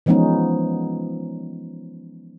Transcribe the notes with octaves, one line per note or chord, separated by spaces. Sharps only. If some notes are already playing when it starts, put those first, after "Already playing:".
E3 F3 G#3 B3 C#4 D#4